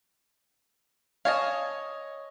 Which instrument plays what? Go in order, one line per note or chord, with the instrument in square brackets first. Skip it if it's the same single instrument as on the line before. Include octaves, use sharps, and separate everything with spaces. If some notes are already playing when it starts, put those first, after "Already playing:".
[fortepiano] C#5 D#5 [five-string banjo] F5 G#5 A5